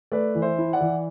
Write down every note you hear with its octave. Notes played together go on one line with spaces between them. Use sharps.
A3 B4 D5
E3
C5 E5
E4
D5 F#5
E3